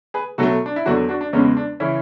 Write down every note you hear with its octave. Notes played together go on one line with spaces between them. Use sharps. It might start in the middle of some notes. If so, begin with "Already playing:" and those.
G#4 B4
B2 F#3 A3 F#4 A4
D4
E4
E2 D3 F#3 D4 F#4
D4 F#4
D4
E2 C#3 G#3 B3 C#4
D4
C#3 E3 C#4 E4